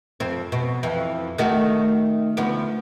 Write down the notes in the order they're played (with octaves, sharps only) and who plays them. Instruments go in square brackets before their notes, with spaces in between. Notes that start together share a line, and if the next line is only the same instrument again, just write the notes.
[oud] F2 C4
B2
F2 E3
D#3 A3 F#4
D2 F3 B3